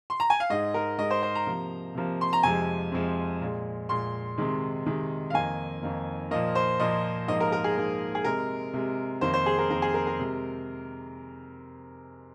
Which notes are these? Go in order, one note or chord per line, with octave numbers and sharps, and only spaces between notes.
C6
A#5
G#5
F5
G#2 G#3 D#5
A#4
G#2 G#3 D#5
C5
C5
A#5
C3 F3 A#3
C3 F3 A#3
C6
A#5
F2 C3 F3 G#3 G#5
F2 C3 F3 G#3
A#2 G#3
A#2 G#3 C6
C3 D#3 G#3
C3 D#3 G#3
F5
F2 D#3 A#3 G#5
F2 D#3 A#3
A#2 F3 A#3 D#5
C5
A#2 F3 A#3 D#5
G#2 F3 A#3 D#5
A#4
A#4
G#4
G#2 F3 A#3
G#4
C3 G#3 A#4
C3 G#3
F2 D#3 A#3 C5
C5
G#4
A#4
F2 D#3 A#3 A#4
G#4
A#4
A#4
C3 G#3